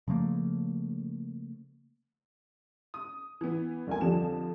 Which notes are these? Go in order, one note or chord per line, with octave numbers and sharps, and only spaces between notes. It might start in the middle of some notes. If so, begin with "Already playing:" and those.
C#3 F3 A3 A#3
D#6
E3 B3
G1 D2 A#4 G#5
F2 D3 F3 G3 E7